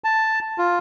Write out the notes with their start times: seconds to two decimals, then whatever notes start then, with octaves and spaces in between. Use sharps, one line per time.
0.04 A5
0.58 F4